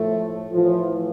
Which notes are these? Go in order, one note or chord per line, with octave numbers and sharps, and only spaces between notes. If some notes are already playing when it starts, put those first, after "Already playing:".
Already playing: A2 F3 A3
A2 E3 F3